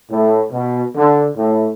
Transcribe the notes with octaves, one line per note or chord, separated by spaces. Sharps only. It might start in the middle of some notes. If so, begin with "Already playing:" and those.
A2
B2
D3
A2